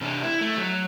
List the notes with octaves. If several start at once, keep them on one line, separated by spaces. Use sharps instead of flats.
C3 D4
E4
A3
F#3